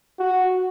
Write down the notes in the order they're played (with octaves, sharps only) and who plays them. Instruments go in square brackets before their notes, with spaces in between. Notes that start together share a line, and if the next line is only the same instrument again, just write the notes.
[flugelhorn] F#4